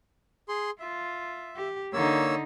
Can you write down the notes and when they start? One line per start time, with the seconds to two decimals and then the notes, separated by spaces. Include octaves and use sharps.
0.49 G#4 C6
0.80 F4 E5
1.56 G4
1.93 D3 A#3 D#4 C#5 E6